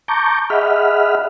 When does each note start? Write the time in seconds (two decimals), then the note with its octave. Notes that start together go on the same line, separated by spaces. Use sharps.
0.08 A5 A#5 C#6 D6 G6
0.50 G#4 D#5 E5 F#5 B5 F6